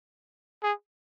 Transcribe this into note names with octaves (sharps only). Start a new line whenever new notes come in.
G#4